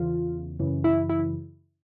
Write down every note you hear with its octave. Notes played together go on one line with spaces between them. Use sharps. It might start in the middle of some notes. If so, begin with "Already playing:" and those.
Already playing: E2 C#3 E3 F4
F#2 C#3 E3
E4
E4